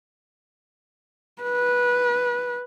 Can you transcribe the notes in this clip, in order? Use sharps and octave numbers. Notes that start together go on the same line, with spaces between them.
B4